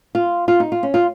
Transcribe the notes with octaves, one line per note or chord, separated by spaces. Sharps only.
F4
F4
D#4
F4
C#4
F4